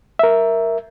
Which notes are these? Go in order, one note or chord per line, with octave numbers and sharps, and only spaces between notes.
A#4 E5